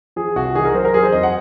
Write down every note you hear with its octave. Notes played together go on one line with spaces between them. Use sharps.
F3 G#4
C2 F#4
D#3 G#4
A#4
F#3 C5
A#4
F#3 G#4
C5
F2 D#5
F#5